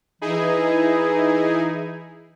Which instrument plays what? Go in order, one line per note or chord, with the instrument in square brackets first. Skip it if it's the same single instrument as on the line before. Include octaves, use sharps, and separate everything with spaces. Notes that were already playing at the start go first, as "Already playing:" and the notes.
[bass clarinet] E3 [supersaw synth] D#4 E4 G#4